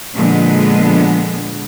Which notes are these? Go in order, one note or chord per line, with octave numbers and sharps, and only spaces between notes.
A#2 D3 F3 G#3 B3